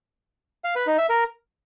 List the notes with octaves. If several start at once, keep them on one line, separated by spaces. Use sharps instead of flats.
F5
B4
D#4
E5
A#4